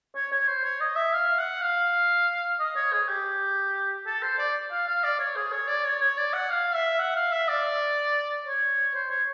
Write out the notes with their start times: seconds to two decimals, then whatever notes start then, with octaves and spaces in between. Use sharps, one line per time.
0.15 C#5
0.32 C#5
0.48 C5
0.64 C#5
0.81 D#5
0.96 E5
1.13 F5
1.38 F#5
1.61 F5
2.59 D#5
2.76 C#5
2.93 G#4
3.08 G4
4.06 A4
4.22 C5
4.39 D5
4.71 F5
4.88 F5
5.04 D5
5.19 C#5
5.36 G#4
5.52 C#5
5.68 D5
5.84 C#5
6.01 C#5
6.18 D5
6.33 F#5
6.50 F5
6.75 E5
6.99 F#5
7.16 F5
7.32 E5
7.48 D5
8.46 C#5
8.94 C5
9.10 C#5